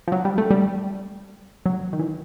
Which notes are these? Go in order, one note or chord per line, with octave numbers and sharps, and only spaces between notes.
F3
F#3
G3
A3
G3
F#3
D#3
E3